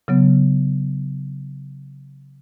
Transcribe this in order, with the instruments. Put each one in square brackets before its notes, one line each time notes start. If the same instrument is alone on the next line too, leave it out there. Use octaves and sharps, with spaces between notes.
[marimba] C#3 F#3 B3